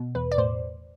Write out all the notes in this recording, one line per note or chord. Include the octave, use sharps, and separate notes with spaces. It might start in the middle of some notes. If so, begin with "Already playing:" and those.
Already playing: B2
E2 B4
D5
A2 C5